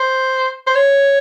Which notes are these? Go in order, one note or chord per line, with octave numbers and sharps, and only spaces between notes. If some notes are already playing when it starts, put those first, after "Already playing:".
Already playing: C5
C5
C#5